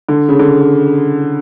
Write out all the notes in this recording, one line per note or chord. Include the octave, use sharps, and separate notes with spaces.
D3
C#3
D3